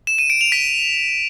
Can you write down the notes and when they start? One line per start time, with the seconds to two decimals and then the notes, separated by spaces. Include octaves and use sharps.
0.07 E7
0.18 D#7
0.30 D7
0.41 F7
0.52 B6